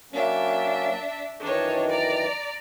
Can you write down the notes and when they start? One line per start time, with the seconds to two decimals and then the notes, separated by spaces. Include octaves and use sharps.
0.13 F#3 A#3 C#4 D4 E5
1.40 F#2 D#3 E3 D4 D#4 C#5
1.89 D5 A#5